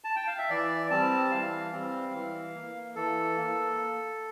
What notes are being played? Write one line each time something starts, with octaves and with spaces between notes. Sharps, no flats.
A5
G5
F5
E5
E3 D5
G3 C4 A5
E3 F5
G3 C4
E3
A#3
E3 A4
A#3